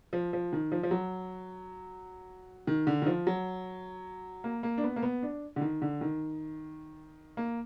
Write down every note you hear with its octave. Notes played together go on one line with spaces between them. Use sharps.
F3
F3
D#3
F3
F3
F#3
D#3
D3
D#3
F3
F#3
A#3
A#3
D4
B3
A#3
B3
D4
D3
D#3
D3
D#3
A#3